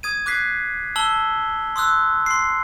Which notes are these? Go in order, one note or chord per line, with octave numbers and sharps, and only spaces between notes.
D#6 G#6 D#7
D6 F#6 G#6 B6 C7
A5 E6 F#7 G7
C6 D#6 E6 F#6
C6 C7